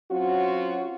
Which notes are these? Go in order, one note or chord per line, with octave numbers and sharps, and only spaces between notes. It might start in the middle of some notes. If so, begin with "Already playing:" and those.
F#3 C4 C#4 F4 F#4